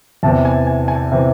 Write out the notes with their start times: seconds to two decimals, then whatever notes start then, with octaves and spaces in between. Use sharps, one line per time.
0.23 E2 C3 E3 A5
0.45 G#5
0.67 G#5
0.88 G#5
1.12 C3 E3